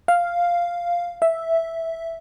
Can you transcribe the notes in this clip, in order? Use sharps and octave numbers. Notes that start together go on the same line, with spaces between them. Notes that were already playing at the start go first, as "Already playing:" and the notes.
F5
E5